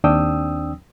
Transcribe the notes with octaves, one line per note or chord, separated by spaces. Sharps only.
D#2 C4 D4 G5 D#6 E6